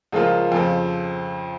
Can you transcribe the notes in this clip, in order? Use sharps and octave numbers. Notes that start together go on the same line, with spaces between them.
C#2 C#3 F3 A#3 F4
F2 C#3 F3